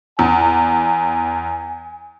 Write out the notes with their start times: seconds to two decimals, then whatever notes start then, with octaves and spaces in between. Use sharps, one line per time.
0.19 E2 G#5